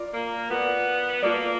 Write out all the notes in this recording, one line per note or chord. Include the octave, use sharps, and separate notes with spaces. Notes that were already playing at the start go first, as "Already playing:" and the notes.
Already playing: F4 A#4 D5
A#3
B3 F4 A#4 D5
A#3 F4 A4 D5